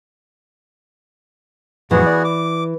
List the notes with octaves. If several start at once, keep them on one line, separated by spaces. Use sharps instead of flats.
F2 A2 E3 F#3 B3 F#4 G#4
D5
D6